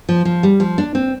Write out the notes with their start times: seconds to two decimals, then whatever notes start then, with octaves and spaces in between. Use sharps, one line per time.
0.09 F3
0.25 F3
0.43 G3
0.60 F3
0.78 D4
0.95 C4